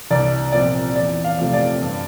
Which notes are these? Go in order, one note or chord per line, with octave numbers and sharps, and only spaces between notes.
C2 D5
A#2 F3 C4 D5
E2 D5
F5
C3 F3 A3
D5
G2